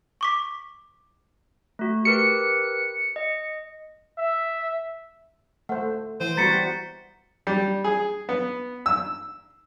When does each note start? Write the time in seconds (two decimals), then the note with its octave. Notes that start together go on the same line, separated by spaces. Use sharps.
0.21 C#6 D6 B6
1.79 A3 F#4
2.05 G4 A#4 B4 C#7
3.16 D#5
4.18 E5
5.69 A3 C5 F#5
6.20 E3 C5 D#7
6.37 G3 B3 F#4 A#5 A6 B6 C#7
7.47 G3
7.84 G#4
8.29 B3
8.86 E6